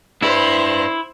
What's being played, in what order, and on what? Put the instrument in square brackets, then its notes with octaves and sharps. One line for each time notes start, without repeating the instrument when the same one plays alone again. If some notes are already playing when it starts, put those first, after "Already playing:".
[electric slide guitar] D4 B4 [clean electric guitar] E4 [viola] C5